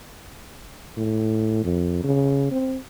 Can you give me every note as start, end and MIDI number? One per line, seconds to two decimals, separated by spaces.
0.97 1.60 45
1.64 2.00 41
2.04 2.51 49
2.52 2.78 60